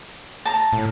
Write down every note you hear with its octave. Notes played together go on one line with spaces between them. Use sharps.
A5 A#5
A2